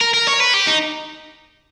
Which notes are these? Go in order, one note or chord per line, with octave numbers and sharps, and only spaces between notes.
A#4
A#4
C#5
B4
G4
D#4